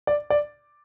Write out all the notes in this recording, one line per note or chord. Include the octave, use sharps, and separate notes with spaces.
D5
D5